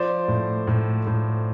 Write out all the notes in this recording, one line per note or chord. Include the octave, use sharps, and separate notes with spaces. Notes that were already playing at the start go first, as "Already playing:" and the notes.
Already playing: F3 C5 D5
A2
A2
A2